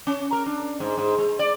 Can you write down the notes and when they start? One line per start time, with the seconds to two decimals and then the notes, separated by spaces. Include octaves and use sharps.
0.07 C#4
0.33 A#4
0.46 D4
0.80 G#2
0.98 G#2
1.18 G#3
1.39 D5